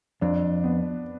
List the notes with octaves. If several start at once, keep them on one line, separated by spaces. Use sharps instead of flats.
F2 D4
B3